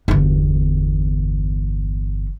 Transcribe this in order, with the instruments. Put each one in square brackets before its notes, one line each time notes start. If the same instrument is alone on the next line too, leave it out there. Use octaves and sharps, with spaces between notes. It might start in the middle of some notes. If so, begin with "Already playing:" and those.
[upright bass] G1 E2